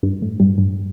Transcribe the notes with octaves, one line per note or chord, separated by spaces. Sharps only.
G2
A2
G2
G2